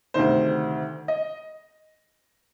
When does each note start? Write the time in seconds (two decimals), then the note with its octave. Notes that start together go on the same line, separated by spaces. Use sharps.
0.14 D2 C3 D#3 C5
1.08 D#5